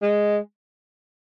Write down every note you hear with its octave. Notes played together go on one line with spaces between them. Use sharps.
G#3